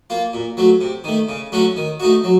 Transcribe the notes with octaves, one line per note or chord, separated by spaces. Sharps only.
A#3 F4
A#2
F#3 A3
C3
D#3 A3
C#3
F#3 A3 C#4 F#4
D#3
A3 D#4 F#4
F#3